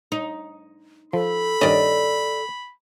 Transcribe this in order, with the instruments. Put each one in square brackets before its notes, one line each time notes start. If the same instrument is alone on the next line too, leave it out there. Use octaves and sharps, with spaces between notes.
[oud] D#4
[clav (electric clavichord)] F3 [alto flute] A4 [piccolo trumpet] B5
[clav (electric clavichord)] G2 D#3 C#4 [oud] D5 D#5